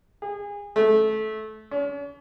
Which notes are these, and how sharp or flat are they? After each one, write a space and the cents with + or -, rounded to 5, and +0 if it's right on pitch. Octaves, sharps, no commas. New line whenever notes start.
G#4 -30
A3 -20
C#4 +45